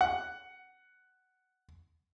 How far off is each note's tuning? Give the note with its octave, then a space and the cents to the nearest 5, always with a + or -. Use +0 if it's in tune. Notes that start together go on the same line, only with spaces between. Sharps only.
F#5 +10